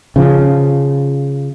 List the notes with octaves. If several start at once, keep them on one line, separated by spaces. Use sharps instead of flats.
C#3 F3